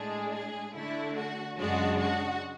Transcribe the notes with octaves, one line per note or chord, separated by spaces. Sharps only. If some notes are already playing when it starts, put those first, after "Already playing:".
Already playing: A2 G#3 D4 G#4
G#4
D3 A3 D4 E4
F#4
F#2 C#3 G#3 D4 F#4
F#4